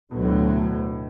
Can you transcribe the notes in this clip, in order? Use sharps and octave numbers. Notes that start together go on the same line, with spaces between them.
D2 B2 D3 F#3 A3
A2